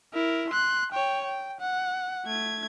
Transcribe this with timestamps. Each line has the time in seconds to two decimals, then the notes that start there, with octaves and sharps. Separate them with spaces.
0.13 E4 A#4
0.50 C6 F#6
0.92 C#5 G5
1.24 G5
1.60 F#5
2.25 A3 G#6